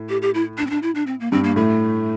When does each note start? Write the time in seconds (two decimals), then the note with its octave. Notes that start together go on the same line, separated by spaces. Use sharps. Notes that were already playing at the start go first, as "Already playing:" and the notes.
Already playing: A2
0.09 G4
0.22 G4
0.34 E4
0.58 D4
0.67 C4
0.70 D4
0.83 E4
0.95 D4
1.07 C4
1.20 A#3
1.32 G2 C4
1.44 A#3
1.56 A2 A3